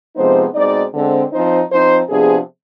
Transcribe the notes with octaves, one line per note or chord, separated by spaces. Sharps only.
C3 F3 G#3 B3 D#4 C5
B2 G#3 C4 D#4 D5
D3 G#3 C4
F3 C4 D#4 C5
F3 C4 D#4 C5
C3 F3 B3 D4 G#4